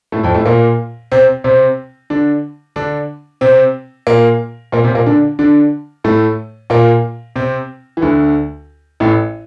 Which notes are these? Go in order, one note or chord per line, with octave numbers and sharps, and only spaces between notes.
A2 A3
F2 F3
A2 A3
A#2 A#3
C3 C4
C3 C4
D3 D4
D3 D4
C3 C4
A#2 A#3
A#2 A#3
C3 C4
A#2 A#3
D3 D4
D3 D4
A2 A3
A#2 A#3
C3 C4
E3
D2 D3
A1 A2